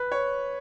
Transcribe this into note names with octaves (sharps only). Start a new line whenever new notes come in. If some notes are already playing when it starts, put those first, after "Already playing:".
Already playing: B4
C#5